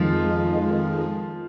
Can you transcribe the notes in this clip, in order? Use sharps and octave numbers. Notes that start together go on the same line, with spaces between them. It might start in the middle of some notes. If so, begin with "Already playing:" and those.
Already playing: F2 D#3 F3 G#3 F4